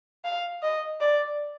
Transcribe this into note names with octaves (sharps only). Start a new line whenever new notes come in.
F5
D#5
D5